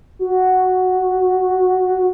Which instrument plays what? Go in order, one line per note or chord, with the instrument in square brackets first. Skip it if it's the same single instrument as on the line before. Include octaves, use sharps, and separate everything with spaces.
[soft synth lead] F#4